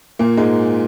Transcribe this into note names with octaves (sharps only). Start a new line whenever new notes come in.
A#2 A#3
G#2 G#3